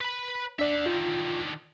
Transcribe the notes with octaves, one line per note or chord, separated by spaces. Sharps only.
B4 B5
D4 D5 E5 F#5
D3 D#3 F4